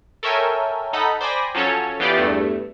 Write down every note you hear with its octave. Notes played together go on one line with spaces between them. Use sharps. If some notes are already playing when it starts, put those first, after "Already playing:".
A4 A#4 C#5 E5 G5 G#5
D#4 A4 F#5 B5
C5 D5 G5 G#5 B5 A#6
F3 F#3 C#4 A4 C#5
E3 B3 F4 G4 D5
E2 G2 A3